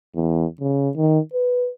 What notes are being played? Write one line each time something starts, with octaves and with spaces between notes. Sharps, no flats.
E2
C#3
D#3
B4